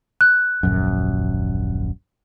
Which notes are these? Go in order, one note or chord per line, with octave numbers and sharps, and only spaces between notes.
F#6
D#1 A#1 F#2